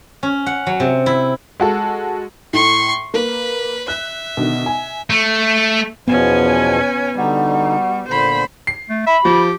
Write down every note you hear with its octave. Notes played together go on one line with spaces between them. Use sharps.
C#4
F#5
F#3
C3
E4
G#3 F#4 A4
A2 C6 C#6
A#3 B4
E5 F#6
B2 D3 D#3
G#5
A3
E2 B2 F3 B3 C#4 G#5
D3 G3 D#4 F#4
A#2 D3 C5 B5
C7
A3
E5 B5
F3 G4